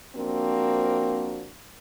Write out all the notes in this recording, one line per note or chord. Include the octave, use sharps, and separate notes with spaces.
F3 A#3 C4 D4 F#4 A#4